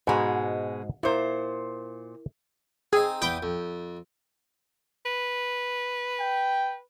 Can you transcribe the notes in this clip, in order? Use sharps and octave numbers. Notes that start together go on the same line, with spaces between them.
G#2 B2 G#3 F#4 D#5
A#2 E4 A#4 C5
C4 D#4 G#4
E2 B4 G5 D#6
F2
B4
G5